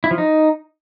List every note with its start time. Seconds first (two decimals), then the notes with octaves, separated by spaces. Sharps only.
0.04 E4
0.11 F3
0.18 D#4